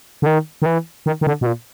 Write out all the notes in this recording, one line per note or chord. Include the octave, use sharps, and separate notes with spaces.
D3
D#3
D#3
E3
D#3
D#3
D3
B2
A#2